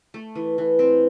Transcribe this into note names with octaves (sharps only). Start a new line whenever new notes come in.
A3
E3
E3
C4